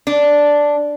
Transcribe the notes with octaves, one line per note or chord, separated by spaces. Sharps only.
D4